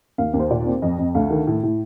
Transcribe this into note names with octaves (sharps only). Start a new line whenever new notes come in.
D#2 F5
D#2
C5
A#2 D5
C4
F2 D#5
F2
D2 F5
D#3
A2
A2